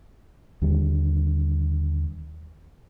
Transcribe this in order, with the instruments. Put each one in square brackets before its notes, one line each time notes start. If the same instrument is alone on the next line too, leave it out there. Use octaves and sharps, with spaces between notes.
[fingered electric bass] D#2 D3 G3